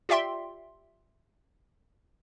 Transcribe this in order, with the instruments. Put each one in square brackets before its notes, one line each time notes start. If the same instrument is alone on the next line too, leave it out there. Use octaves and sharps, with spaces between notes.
[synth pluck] F4 G4 D5 E5 G5 C6